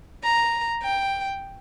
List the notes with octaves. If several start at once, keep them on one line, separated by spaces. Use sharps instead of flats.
A#5
G5